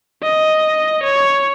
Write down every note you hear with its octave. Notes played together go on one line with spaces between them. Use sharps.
D#5
C#5